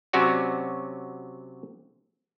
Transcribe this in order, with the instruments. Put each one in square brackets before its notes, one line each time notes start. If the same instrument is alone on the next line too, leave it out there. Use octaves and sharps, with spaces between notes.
[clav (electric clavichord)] C3 F#3 C#4 F#4 D5